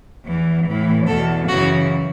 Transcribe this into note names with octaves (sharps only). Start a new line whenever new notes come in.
E2 E3
A2 E3
E2 B2 A4
F#2 C#3 E3 F#4